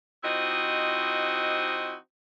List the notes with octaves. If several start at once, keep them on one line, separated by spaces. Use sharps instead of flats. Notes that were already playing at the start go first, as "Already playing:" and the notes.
F3 C4 D#4 E4 F#4 D#5